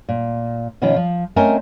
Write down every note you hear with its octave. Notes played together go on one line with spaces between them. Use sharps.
A#2
B2 D#3 F3 C#4 F4
F3
A3 C4 C#4 A#4 D#5 G#5